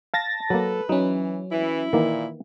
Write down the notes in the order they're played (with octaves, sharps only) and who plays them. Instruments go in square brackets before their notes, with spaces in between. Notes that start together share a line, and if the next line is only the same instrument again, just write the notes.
[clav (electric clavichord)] F5 [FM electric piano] A5 A6 A#6
[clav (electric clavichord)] F#3 A#3 [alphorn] A4 [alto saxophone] B4
[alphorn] E3 [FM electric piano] F#3 C#4 [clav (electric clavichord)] D#4
[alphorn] E3 [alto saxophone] E4
[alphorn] A#2 [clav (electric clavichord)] D#3 E3 A#3